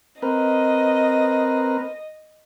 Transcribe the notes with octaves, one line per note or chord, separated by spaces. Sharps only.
C4 A#4 B4 D#5